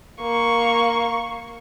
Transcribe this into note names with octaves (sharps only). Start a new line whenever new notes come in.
A#3 C#6